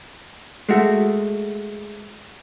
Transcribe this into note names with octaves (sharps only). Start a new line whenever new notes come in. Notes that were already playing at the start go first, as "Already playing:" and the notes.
G#3 A3 F#4